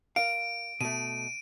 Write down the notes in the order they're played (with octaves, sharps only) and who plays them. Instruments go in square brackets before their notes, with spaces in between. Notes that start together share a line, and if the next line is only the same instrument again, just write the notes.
[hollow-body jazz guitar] A#4 F5 [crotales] D7
[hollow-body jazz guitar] B2 A3 [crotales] D#7